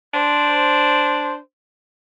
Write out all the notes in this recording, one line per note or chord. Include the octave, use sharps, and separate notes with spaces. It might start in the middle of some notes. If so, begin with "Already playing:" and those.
D4 C5